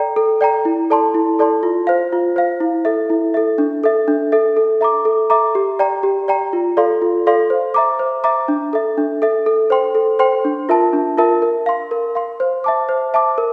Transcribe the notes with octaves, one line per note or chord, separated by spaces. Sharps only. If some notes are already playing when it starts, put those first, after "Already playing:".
Already playing: A4 D5 G5 A#5
A4
D5 G5 A#5
E4
A4 D5 A5 C6
E4
A4 D5 A5 C6
F4
C5 F5
F4
C5 F5
E4
A4 E5
E4
A4 E5
D4
A4 E5
D4
A4 E5
A4
E5 A#5 D6
A4
E5 A#5 D6
G4
D5 G5 A#5
G4
D5 G5 A#5
F4
A4 D5 F5 C6
F4
A4 D5 F5 C6
C5
E5 A#5 D6
C5
E5 A#5 D6
D4
A4 E5
D4
A4 E5
A4
C5 G5 C6
A4
C5 G5 C6
D4
F4 A#4 E5 A5
D4
F4 A#4 E5 A5
A#4
F5 C6
A#4
F5 C6
C5
E5 A5 D6
C5
E5 A5 D6
A#4